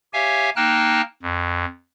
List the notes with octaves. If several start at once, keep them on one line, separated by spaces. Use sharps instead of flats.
G4 C#5 E5 F5 G#5
A#3 D#4 G5 A5 F6 F#6
F2